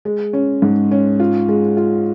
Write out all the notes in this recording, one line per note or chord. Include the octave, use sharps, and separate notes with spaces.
G#3
C#4
G#2
C#4
F4
G#3
F4